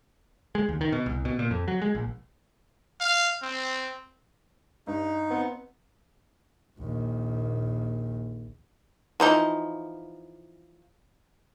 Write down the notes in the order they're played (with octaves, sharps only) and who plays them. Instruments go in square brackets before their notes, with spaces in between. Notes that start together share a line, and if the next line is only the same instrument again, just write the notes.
[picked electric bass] G#3
D#2
D#3
B2
C2
B2
A#2
F2
F#3
G#3
A#1
[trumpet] F5
C4
[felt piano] G2 [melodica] D#4
[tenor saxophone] B3 [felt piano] C4
[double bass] A#1 D#2
[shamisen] E3 F3 D#4